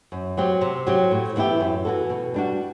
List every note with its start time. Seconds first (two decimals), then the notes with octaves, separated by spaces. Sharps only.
0.12 F#2
0.37 F#3 C4 G4
0.61 C3
0.87 F#3 C4 G4
1.11 A2
1.36 E3 B3 E4 G4
1.60 F#2
1.85 E3 B3 F#4 A4
2.10 B2
2.34 G3 D4 F#4